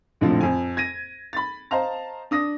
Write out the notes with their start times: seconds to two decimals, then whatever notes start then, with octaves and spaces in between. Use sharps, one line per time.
0.21 F1 A#1 A2 D3 F3 C4
0.41 F2 G#5
0.77 G#6 A#6 D#7
1.33 B5 A6
1.71 C5 D#5 F5 A5 A#5
2.31 D4 D#6 A#6